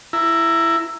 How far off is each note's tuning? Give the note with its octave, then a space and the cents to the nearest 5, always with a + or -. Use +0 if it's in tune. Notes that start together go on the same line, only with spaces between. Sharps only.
E4 +10 A#5 -5